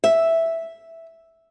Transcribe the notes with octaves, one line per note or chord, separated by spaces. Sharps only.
E5